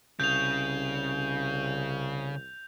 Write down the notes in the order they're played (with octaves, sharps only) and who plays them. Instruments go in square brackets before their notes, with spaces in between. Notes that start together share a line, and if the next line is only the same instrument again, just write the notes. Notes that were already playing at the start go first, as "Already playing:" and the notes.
[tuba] C2 [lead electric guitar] C#3 [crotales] G6 F7